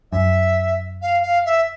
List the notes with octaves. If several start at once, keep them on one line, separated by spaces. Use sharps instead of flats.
F#2 E5
F5
F5
E5